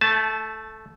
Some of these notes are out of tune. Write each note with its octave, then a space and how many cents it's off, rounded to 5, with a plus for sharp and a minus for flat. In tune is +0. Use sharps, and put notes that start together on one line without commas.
A3 +0 A5 -25